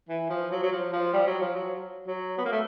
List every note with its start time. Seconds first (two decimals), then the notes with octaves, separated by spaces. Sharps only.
0.09 E3
0.30 F3
0.52 F#3
0.63 F#3
0.72 F3
0.93 F3
1.13 G3
1.27 F#3
1.41 F3
1.55 F#3
2.07 F#3
2.38 B3
2.45 A#3
2.52 A3